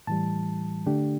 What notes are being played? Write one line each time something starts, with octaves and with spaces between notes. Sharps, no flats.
A2 E3 G3 A5
D3 A3 D4 G4